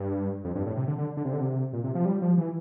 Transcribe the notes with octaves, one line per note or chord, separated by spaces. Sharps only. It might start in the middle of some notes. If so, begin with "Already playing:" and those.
Already playing: G2
F2
G2
A2
C3
D3
D3
D3
C3
D3
C3
A#2
C3
F3
G3
F3
E3